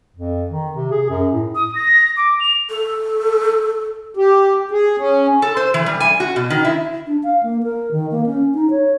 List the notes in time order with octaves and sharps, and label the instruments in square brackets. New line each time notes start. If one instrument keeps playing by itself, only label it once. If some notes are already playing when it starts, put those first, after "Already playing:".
[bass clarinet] F2
D#3
C3
G#4
F#2
A2
[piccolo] D#6
A#6
D6
F7
[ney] A4
[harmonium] G4
G#4
C#4
[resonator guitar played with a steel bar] A4
C5
E3
G3
G#5
F#4
B2
D#3
E4
[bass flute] D4
F5
A#3
A#4
D#3
A#3
C#4
D#4
C#5